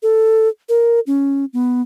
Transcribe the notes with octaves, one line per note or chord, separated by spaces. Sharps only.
A4
A#4
C#4
B3